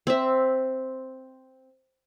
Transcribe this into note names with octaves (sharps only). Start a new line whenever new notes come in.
C4 E5